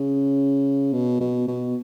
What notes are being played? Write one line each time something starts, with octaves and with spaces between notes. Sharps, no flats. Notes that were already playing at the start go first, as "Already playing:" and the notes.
Already playing: C#3
B2
B2
B2